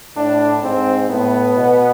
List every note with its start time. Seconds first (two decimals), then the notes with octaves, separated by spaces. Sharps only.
0.17 A2 D4
0.63 G#2 C4
1.10 A2 B3
1.57 B2